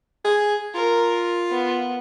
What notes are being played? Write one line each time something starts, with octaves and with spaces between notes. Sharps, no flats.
G#4
F4 A#4
B3